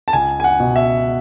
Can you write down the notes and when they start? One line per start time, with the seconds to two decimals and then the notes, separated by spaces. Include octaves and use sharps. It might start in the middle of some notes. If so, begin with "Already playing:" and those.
0.08 A5
0.13 C#2 G#5
0.40 G#5
0.44 F#5
0.60 B2
0.76 E5